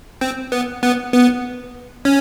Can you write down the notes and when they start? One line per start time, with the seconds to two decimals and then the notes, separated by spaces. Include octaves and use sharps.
0.21 C4
0.52 B3
0.83 B3
1.13 B3
2.05 C#4